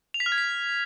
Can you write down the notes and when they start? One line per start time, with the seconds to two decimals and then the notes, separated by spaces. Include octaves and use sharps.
0.14 F7
0.20 B6
0.26 F6
0.32 G#6
0.38 B6